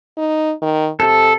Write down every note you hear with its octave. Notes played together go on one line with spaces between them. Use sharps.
D#4
D#3
C3 A4